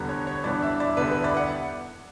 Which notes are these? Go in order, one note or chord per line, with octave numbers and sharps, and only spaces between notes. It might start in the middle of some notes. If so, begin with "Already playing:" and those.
Already playing: E2 D3 G3 B3 A#5
C#5
C#5
G2 E3 B3 D4 D5
E5
D5
E2 D3 G3 B3 E4 B4
B4
D5
F#5